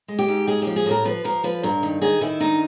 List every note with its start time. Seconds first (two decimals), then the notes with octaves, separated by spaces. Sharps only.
0.08 G#3
0.19 G4
0.28 G#2
0.47 G#3 G#4
0.62 G4
0.67 F3
0.76 G#4
0.86 A2 A#4
1.05 F3 B4
1.24 F3 A#4
1.44 F3 B4
1.63 G2 A#4
1.83 D#3
2.02 D#3 G#4
2.21 D#3 E4
2.40 G2 D#4